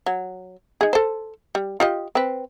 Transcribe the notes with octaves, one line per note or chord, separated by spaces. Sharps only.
F#3
D#4 G#4
A4 C5
G3
F4 G4 D#5
C4 B4